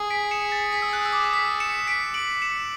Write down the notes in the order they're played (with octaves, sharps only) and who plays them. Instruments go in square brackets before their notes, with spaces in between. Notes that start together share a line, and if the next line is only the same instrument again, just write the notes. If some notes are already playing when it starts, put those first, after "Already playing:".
Already playing: [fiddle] G#4
[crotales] B6 D7
C#7 E7
A6 C#7
B6
E6
F#6
E6
D6
B6
C#7 E7
B6 D7
D7 F#7
C#7 E7